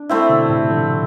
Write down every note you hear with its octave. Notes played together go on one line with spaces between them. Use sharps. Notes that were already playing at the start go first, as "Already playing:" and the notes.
Already playing: D4
A3 C4 E4
B2 D3
A2 C3
D3 F3